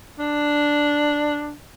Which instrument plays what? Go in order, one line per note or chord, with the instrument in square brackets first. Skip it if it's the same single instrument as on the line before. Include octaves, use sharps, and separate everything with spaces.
[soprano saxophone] D4